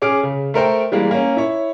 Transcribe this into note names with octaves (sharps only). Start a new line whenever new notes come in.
C#4 G#4 D6 F6 D7
C#3
A3 A#4 C5 G5
E3 G3 G#3 A#3
A#3 C#4
E4 C#5